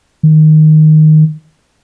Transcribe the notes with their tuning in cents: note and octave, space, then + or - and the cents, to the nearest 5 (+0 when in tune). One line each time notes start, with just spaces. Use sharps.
D#3 -5